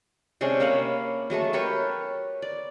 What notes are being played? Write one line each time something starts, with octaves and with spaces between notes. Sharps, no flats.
C3 G#3 C#4 D4
A#3 C#4 F5 B5
F#3 G#3 A3 A5
G4 A#4 B4 C#5
D5